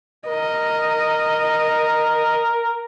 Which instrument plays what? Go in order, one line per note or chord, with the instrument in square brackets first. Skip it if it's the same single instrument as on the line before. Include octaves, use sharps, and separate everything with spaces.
[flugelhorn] A#4 [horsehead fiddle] D#5